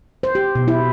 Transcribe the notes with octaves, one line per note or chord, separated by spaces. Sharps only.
C5
G4
B2
E4